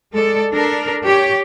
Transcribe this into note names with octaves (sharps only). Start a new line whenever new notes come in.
G#3 A4 D5
D4 A4 A#4
G4 C#5